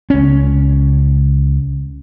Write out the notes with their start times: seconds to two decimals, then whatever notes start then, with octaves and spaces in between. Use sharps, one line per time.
0.10 C#2 C#4